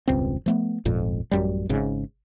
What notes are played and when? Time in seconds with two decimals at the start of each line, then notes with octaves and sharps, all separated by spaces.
0.08 E1 C#2 G2 C4
0.46 F3 A3 B3
0.85 D#1 G#1 F2 A#2
1.31 A1 F#2 G3
1.69 G#1 G#2 C#3